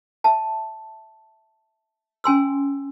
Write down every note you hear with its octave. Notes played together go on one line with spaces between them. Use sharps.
E5 A5
C#4 G#5 C6 E6